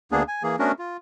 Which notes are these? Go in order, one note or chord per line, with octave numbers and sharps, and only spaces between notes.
D2 A#3 B3 D4 G#4
G#5
E3 A#3 G#4
A3 B3 C#4 D4 F#4 A#4
F4